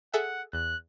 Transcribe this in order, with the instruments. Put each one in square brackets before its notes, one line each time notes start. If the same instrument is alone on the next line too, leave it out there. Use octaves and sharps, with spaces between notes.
[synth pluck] G#4 A4 E5 [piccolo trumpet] F#5
[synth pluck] E2 [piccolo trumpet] F#6